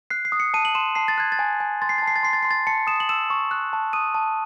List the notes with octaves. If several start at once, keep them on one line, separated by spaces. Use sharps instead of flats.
F#6 C7
C7
D#6
C#7
A5 D#7
F#7
C6 E7
A5 C7
A6
F#6 G#6
A6
G#5
G#5
C6 A6
C7
A6
A5
C7
A6
C6 C7
A6
C6 C7
A6
A5 C#7
D#6 E7
F#7
E6 E7
C#6
F#6
A5
D#6 D#7
A5